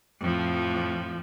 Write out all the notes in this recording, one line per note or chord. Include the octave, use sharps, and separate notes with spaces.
F2 A2 F3